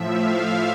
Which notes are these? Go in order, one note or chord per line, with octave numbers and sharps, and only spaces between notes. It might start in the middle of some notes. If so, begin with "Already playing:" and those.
Already playing: A2 F3 E5
F5